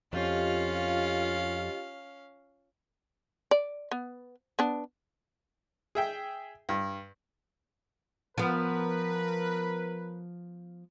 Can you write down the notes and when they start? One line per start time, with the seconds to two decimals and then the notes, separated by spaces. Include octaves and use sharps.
0.13 F2 C#4 F4 G4 D#5 F5
3.51 D5
3.91 B3
4.59 B3 D4
5.95 G#4 E5 G5
6.69 G2
8.38 F3 B3 A#4 B4